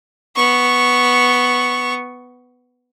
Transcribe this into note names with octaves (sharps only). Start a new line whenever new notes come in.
B3 C#6